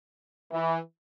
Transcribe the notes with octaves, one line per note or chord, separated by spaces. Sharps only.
E3